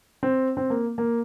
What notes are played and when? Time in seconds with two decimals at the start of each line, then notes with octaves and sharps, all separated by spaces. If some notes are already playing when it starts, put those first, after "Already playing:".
0.23 C4
0.57 C4
0.70 A#3
0.98 A#3